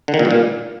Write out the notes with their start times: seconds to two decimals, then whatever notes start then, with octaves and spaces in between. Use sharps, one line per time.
0.08 D3
0.14 D#3
0.19 A#2
0.25 G2
0.31 A#2